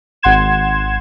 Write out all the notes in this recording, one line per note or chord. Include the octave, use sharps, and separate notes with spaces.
G#1 F#5 C6 G#6 E7